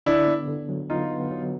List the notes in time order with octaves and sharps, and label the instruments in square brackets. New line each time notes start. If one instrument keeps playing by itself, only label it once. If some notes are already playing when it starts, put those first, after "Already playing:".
[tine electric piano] D3 [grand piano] D4 E4
[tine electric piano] B3
D3
F#3
[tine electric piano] B3 [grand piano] D#4 F4
[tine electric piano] B3
F#3